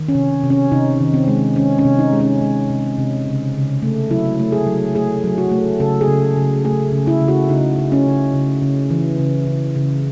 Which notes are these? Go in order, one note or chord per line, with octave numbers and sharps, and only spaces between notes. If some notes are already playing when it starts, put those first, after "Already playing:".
Already playing: D#3
C#4
C3
C3
C#4
C3 D#4
D#3
C4
G#3
D#3 C#4
C#4
C3
D#4
G#3
C#4
G#3
C3
C3
C#3
C#3
A3
F#3 E4
A3
G#4
F#3
A3 G#4
F#3
F#4
A3
C#3 A4
G#4
C#3
C#3
A3 G#4
C#3
E4
C#3
F#4
C#3 D#4
C#3
C#4
C#3
C#3
C#3
E3
C#3
C#3
C#3